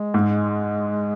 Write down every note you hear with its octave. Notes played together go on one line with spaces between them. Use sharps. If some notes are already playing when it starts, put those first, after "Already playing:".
Already playing: G#3
G#2